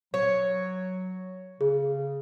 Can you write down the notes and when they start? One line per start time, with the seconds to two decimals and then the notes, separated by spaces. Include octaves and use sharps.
0.14 F#3 C#5
1.61 C#3 G#4